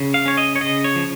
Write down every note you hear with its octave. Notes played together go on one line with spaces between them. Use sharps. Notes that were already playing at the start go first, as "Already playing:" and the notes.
Already playing: C#3
F5
C#4 C#5
D#5
C#5
C#3 D#5
C#5
F3